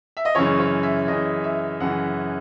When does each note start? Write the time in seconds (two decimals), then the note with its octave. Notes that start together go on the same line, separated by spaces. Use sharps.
0.17 E5
0.25 D#5
0.35 F#2 C#3 E3 C#5
0.59 C#5
0.83 E5
1.08 F#2 C#3 E3 D#5
1.44 E5
1.80 F#2 C#3 E3 F#5